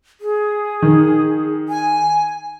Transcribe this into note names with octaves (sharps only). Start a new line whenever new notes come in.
G#4
D#3
G#5